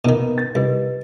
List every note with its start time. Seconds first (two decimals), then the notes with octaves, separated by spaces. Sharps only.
0.05 B2 D#3 A#3 B3 D#4
0.38 A6
0.55 C2 G4 B4 D#5